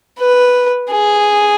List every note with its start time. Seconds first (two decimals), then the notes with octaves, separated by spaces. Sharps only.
0.19 B4
0.91 G#4